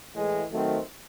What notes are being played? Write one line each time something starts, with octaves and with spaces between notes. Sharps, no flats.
A2 E3 G#3
D#3 F#3 A3 C4